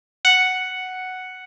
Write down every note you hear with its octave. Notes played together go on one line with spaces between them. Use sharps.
F#5